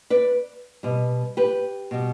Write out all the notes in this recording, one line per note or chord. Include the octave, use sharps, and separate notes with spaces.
B4 D5
B2 G3
G4 B4
B2 G3